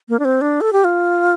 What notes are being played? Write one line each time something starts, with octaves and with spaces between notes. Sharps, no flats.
A#3
D4
C4
D4
A4
G4
F4